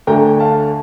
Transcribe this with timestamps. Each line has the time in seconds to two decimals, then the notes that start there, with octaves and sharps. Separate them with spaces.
0.07 D2 D3 A3 G5 A#5
0.40 F5 A5